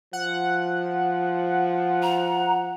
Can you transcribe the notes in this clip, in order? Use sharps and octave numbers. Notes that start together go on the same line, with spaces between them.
F3 F#5
A#5